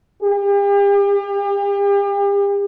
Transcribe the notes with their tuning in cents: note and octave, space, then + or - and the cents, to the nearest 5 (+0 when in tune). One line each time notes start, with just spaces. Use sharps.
G4 +40